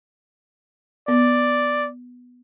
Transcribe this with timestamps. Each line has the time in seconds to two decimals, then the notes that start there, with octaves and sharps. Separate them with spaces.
1.08 B3 D5